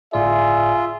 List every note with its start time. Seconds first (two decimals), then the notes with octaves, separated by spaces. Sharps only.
0.13 G1 A2 F4 G#4 D5 E5